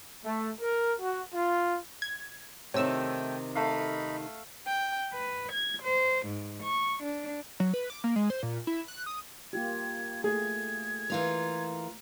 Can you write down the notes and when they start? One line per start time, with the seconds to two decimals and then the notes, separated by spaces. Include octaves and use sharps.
0.24 A3
0.61 A#4
1.00 F#4
1.33 F4
2.02 G#6
2.74 C3 D#3 A3 C#5 G5 E6
3.55 A3 D#4 F5 B5
4.66 G5
5.13 B4
5.51 G#6
5.83 C5
6.26 G#2
6.63 C#6
7.03 D4
7.60 F#3
7.74 B4
7.90 D6
8.04 A#3
8.16 G#3
8.30 C5
8.43 A#2
8.67 E4
8.88 F#6
9.06 D#6
9.53 A#3 F4 G4 G#6
10.24 A3 G#4 G#6
11.10 E3 F4 A#4